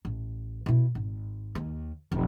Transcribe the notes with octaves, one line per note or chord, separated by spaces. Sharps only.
A1
B2 E4
G#1
D#2
F1 B1